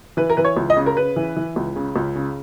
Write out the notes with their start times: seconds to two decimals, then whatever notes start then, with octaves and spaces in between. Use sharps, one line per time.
0.17 E3 B4
0.30 A#4
0.37 E3 B4
0.45 C#5
0.57 C#2
0.70 D#5
0.77 C#3
0.86 A#4
0.97 C#3 B4
1.16 E3
1.37 E3
1.56 C#2
1.76 C#3
1.96 C#2
2.15 C#3